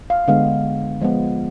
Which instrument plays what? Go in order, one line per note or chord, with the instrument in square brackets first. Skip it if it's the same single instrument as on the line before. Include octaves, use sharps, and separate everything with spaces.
[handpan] F5
D3 G#3 B3 F5
F3 G#3 B3